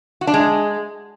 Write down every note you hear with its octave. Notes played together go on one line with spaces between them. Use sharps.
F#4
D4
G#3